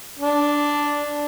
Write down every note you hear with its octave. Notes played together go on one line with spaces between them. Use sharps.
D4